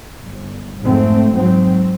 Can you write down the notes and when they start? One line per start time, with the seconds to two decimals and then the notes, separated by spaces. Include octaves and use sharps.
0.24 G1
0.83 F2 G#2 A3 C4
1.34 G#2 F#3 C4